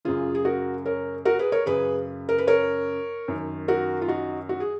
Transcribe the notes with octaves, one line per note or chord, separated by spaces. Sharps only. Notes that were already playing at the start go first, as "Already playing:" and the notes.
F#2 C#3 F4 G#4
G#4
F#4 A#4
A#4 C#5
F#4 A#4
G#4 B4
A#4 C#5
F#2 C#3 G#4 B4
A#4
B4
A#4 C#5
F#2 D#3
F#4 A#4
F4
D#4 F#4
F#4
G#4